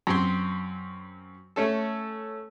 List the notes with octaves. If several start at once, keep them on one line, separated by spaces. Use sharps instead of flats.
F#2 C4 C6
A3 C#4 A4